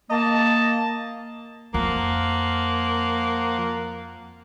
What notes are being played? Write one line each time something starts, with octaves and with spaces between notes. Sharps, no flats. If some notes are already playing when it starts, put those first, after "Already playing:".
A#3 D#5 A5
F2 F3 A#3 F#5